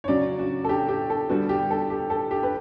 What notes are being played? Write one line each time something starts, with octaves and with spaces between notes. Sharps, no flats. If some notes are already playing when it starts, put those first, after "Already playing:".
C#5
C#3 F#3 C#4 D5
F#4
A4
G4
G4
A4
D3 G3 B3 F#4
G4
A4
G4
A4
G4
B4